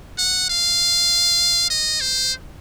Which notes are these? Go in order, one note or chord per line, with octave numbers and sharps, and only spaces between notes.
F#5
F5
D#5
C5